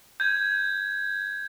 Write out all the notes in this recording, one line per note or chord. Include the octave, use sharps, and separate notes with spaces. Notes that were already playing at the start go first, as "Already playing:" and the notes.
G6 G#6